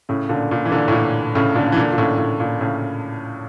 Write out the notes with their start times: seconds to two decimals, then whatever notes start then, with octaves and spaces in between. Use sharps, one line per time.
0.09 A2 C#3
0.29 A#2 D3
0.51 A#2
0.65 E3
0.71 A#2 D3
0.88 A2
0.92 A#2
1.35 A2 C#3
1.55 A#2 D3
1.72 E3
1.76 A#2 D3
1.92 A#2
1.98 A2 C#3
2.18 A2
2.40 A#2
2.60 A2 C#3